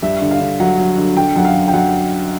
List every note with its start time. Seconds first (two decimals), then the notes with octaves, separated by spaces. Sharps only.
0.02 G2 E5
0.22 D3
0.31 F5
0.41 D3
0.60 F#3 F#5
0.78 F#3
0.98 D3
1.16 D3 G5
1.36 F#2 F#5
1.45 F5
1.54 D3
1.68 G5
1.73 F#2 F#5